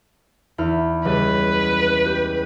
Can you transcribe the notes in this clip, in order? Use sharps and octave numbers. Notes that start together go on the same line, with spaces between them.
E2 E4 F6
C#2 G3 B4
G4